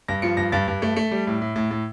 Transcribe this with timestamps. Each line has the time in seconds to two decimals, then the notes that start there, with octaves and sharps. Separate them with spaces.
0.08 G2 A#6
0.22 F3 C#7
0.37 G2 A#6
0.52 G2 A6
0.68 G2
0.82 A3
0.96 A3
1.11 G3
1.27 A2
1.42 A2
1.56 A2
1.71 A2